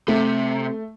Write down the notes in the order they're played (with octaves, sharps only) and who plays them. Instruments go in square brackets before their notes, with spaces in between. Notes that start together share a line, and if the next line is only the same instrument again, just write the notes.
[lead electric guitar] C3 [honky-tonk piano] A3